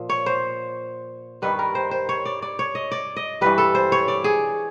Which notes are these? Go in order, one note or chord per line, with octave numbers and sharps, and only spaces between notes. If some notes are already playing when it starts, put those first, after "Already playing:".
Already playing: A#2 F3
C#5
C5
G2 D#3 G3 B4
A#4
C5
C5
C#5
D5
D5
C#5
D#5
D5
D#5
G2 E3 G3 B4
A4
C5
C#5
D5
G#4